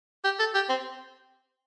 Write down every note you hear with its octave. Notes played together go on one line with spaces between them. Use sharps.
G4
A4
G4
C4